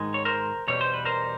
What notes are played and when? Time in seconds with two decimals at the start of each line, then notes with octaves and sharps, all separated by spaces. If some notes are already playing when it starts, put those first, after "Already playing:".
Already playing: G#2 D#3 G#3
0.14 C#5
0.25 A#4 C5
0.67 E2 B2 G3 C#5
0.81 C5
0.94 B4
1.05 A#4 C5